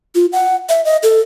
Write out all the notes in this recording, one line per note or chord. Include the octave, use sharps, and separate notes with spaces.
F4
F#5
E5
D#5
A4